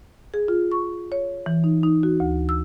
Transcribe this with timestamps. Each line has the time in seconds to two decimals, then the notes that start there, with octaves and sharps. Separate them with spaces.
0.34 G#4
0.48 F4
0.72 C#6
1.12 C#5
1.46 E3
1.64 D#4
1.83 D#4
2.03 F#4
2.20 D2
2.49 E6